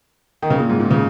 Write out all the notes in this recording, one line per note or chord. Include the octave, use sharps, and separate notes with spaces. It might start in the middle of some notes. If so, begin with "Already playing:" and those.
D#3
C#3
A#2
G#2
A#2
C#3